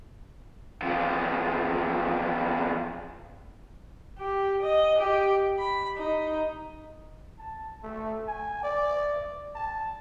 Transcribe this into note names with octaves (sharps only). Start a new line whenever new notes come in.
E2 F3
G4
D#5
G4
B5
D#4
A5
A3
G#5
D5
A5